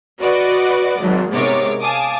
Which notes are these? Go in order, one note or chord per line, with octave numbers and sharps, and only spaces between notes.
F#4 B4 D5 D#5
G#1 F#3
G#2 C3 B3 A#4 C#5 D6
F5 G#5 A5 D6 D#6